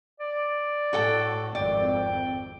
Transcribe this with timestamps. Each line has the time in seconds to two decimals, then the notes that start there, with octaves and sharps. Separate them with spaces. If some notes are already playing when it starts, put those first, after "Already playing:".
0.20 D5
0.93 A2 F#4 A4 G5
1.55 G#1 F2 D5 G5